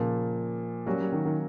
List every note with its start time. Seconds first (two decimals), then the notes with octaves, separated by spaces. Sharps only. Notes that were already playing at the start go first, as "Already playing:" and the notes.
Already playing: A#2 C#3 F3 A#3
0.86 F#3 G3 A#3 C#4 F#4
1.00 G3
1.12 D#3
1.25 D#3